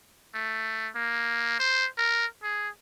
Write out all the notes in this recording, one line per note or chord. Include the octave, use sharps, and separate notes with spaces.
A3
A#3
C5
A#4
G#4